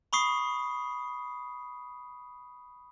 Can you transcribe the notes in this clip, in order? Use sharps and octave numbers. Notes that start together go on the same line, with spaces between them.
B5 C#6 D#6 C7